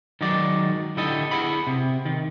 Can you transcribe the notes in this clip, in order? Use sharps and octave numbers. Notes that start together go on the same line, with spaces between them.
D#3 F#3 G#3 D#4 D5
D3 E4 G4 A4 D#5
E4 G#4 F#5 B5
C3
D#3